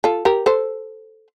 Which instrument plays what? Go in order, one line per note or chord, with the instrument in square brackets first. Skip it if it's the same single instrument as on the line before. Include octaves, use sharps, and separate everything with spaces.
[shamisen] F4 A4
G4 A#4
A4 C5